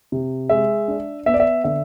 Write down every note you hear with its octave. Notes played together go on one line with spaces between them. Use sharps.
C3
G#3 E5
D4
B3 E5
D5
E5
D3 E5